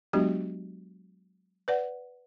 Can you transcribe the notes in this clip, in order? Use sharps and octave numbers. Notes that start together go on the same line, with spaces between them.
F#3 G#3 B3 D4 F#4 G4
B4 D5 F#5